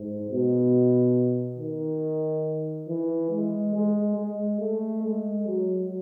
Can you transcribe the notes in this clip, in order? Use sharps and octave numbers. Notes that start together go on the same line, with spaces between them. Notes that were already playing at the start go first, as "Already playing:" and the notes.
Already playing: G#2
B2
D#3
E3
G#3
G#3
G#3
A3
G#3
F#3